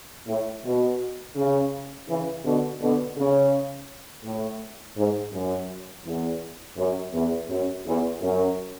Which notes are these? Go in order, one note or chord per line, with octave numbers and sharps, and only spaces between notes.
A2
B2
C#3
C#3 E3
B2 D3
B2 D3
C#3
A2
G#2
F#2
E2
F#2
E2
F#2
E2
F#2